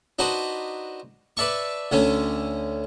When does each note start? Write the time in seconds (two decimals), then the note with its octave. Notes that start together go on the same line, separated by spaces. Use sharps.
0.19 D4 D#4 F#4 B4 C5
1.37 B4 D5 E5 A5 C#6
1.92 D2 D3 A3 C#4